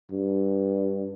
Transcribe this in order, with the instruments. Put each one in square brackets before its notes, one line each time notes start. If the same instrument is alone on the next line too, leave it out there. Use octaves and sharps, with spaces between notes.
[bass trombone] G2